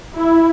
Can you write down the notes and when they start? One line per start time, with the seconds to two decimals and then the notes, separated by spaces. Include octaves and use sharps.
0.16 E4